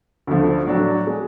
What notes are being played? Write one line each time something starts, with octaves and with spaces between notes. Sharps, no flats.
D2 D3 F3 A3
A2 F#3 A3 D4 F#4
G#3